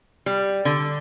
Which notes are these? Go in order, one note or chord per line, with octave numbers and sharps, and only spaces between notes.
G3
D3